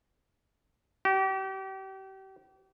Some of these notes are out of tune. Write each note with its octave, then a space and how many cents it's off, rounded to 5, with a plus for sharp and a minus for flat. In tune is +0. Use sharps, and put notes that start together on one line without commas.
G4 -35